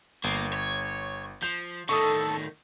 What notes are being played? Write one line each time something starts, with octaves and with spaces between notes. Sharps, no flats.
G1 A#3
C#5
F3 G6
A2 D#3 A4 C#6 D#6